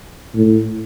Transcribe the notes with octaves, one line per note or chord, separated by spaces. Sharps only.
A2